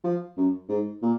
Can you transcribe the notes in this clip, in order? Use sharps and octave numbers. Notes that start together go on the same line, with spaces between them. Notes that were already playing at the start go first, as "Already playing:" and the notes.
F3
F#2
G#2
A#2